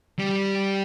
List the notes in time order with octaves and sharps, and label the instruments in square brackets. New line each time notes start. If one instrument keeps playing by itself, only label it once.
[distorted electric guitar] G3